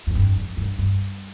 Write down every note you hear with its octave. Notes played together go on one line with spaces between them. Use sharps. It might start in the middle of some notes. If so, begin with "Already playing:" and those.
F2
G2
F2
G2
G2